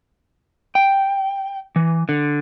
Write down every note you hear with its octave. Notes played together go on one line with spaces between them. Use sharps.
G5
E3
D3